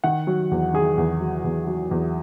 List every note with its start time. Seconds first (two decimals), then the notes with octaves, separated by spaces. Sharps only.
0.04 D#3 F#5
0.27 F#3
0.51 E2
0.74 D#3 G#4
0.98 E2
1.21 F#3
1.44 E2
1.67 F#3
1.91 E2